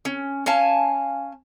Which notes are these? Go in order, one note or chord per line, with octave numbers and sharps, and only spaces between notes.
C#4
C#4 F5 G#5 A5